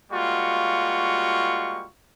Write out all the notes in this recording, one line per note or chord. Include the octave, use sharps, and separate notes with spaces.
G3 G#3 A#3 F4 F#4 C#6